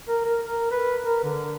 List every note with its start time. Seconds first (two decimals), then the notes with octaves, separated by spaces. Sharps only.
0.08 A#4
0.25 A#4
0.46 A#4
0.71 B4
1.05 A#4
1.23 D3